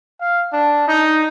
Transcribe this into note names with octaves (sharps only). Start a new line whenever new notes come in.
F5
D4
D#4